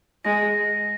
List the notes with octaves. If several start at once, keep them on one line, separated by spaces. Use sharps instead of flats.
G#3 A#6